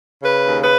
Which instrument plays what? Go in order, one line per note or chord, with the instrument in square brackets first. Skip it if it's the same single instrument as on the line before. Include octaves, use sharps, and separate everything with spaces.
[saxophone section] C#3 B4
D#2
B4